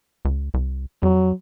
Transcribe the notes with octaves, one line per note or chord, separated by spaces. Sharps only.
C#2
C2
F2 F#3